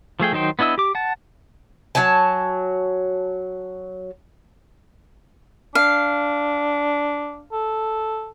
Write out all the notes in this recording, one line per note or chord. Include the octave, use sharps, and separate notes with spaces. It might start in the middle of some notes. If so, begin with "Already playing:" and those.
F3 A3 G#4 G5
D#3 F#3 D#4 C5 G5
B3 D4 E4 D#5 E6
G4 D6
F#5 A5
F#3 C#5 G#5 A5
D4 F5
A4